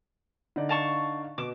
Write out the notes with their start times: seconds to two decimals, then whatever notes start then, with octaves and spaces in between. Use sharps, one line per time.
0.56 D3 D#4 D5
0.69 F5 A5 C#6
1.38 B2 D6 E7